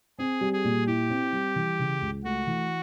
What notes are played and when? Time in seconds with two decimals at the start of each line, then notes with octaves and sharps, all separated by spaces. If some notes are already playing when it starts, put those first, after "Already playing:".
0.19 C4 G#4
0.41 G3
0.53 G#4
0.64 A#2
0.87 E4 G4
1.10 C4
1.32 G3
1.56 E3
1.79 C#3
2.01 C#2
2.24 A3 F#4
2.47 E3